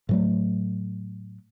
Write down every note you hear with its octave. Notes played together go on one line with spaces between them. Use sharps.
A2 F#3 A3